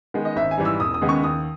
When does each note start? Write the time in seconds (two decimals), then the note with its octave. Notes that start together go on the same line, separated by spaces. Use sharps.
0.14 D#3 G#3 B3
0.25 D#5
0.36 G#1 E5
0.51 G#5
0.58 G#2 E3 G3
0.65 E6
0.80 E1 D#6
0.94 D#6
1.02 D#2 C#3 G#3 B3
1.09 C#6
1.23 D#2 D#6